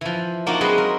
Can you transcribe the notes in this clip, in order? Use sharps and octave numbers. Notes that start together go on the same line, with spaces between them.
E3 F3
A#3 D4 D#4 F4 F#4 F#5
F#3 G#3 C4 B4 D#5 C6
A#4